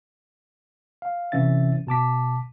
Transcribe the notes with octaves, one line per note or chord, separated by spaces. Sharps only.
F5
C3 E3 C#4 E5 A6
B2 A5 D6 B6